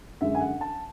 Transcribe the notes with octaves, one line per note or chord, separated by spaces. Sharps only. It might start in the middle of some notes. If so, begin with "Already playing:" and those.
F#2 D3 G#3 E5
G#5
F#5
A5